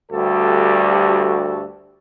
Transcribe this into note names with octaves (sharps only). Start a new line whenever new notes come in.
D2 G2 G3 F#4 G4 A4